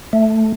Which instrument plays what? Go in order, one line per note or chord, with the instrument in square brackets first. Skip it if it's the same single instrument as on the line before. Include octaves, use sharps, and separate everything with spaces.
[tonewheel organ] A3